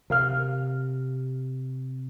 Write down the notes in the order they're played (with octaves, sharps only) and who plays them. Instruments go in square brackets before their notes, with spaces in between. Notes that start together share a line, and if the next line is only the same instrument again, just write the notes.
[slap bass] C3 [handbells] A#4 F5 F6